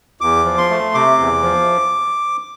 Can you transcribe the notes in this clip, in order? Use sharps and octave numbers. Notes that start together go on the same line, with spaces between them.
E2 D6
F3
C6
A3
C3 D6
E2
F3